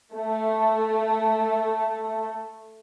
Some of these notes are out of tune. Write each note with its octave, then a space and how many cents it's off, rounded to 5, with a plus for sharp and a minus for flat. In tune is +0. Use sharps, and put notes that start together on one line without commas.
A3 +0